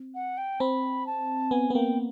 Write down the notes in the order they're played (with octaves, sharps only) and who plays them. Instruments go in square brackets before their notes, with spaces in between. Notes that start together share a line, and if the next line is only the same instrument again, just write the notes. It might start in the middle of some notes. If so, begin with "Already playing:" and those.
Already playing: [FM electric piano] C4
[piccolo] F#5
G5
[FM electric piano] C4 [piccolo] B5
[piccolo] A5
[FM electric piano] B3 [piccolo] G#5
[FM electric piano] B3
[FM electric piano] A#3 [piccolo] G5